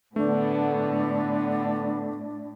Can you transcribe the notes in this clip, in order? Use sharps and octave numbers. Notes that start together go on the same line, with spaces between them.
A2 D3 A3 B3 D4